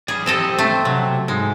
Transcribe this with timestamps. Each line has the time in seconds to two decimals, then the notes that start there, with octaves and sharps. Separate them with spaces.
0.08 G#4 D5 B5
0.26 C4 E4 G4 A4 D#5
0.58 A3 C4
0.85 C3 F#3
1.28 G#2 G#3